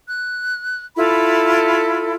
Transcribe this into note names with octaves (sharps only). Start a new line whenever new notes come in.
F#6
E4 F4 A4 B5